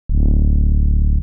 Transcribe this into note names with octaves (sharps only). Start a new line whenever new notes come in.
D1